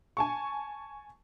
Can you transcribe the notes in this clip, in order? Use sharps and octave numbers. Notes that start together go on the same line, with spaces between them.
G#5 A5 C#6